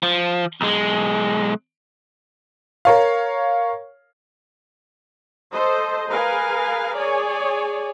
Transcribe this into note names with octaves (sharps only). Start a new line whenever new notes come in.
F3
B1 G#3
A#4 C#5 F5
A4 C5 D#5
G#4 A#4 B4 F5 G#5
G#4 C#5 D5 G#5